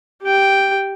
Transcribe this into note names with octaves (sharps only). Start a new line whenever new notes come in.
G4 G5